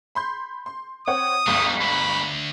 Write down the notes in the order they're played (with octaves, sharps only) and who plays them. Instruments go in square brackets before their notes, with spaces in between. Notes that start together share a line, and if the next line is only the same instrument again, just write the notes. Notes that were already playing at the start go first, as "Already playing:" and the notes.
[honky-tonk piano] B5 C6 G6
C6
[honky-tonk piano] C4 C#5 F#5 [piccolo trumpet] D#6
[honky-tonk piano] G1 C#2 [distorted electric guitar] F3 G3
[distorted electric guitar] D2 [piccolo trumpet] B5